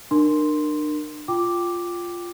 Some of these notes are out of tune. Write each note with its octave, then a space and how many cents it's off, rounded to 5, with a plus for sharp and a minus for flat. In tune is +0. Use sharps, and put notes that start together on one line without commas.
D4 +40 A#4 +0 C6 +0
F4 +0 G5 +0 D6 +0